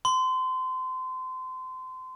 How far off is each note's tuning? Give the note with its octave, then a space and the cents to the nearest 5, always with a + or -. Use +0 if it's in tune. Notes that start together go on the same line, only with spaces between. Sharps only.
C6 -25